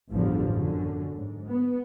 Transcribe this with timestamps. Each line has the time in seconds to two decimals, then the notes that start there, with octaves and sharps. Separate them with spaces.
0.11 A1 E2 G2 D3 F3
0.50 F#2 D3
1.16 G#2
1.49 B3